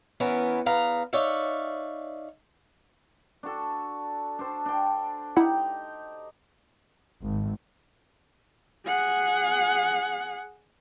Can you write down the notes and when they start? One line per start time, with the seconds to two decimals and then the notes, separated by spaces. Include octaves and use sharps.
0.20 E3 B3 C#4 A#4
0.66 E2 B3 F5 A#5
1.13 D#4 C#5 D5 E5 F5
3.43 D4 F#4 A4
4.39 D4 A4 C5
4.66 D4 G5
5.37 D#4 E4 G4 F#5
7.22 G#1
8.87 G#4 F#5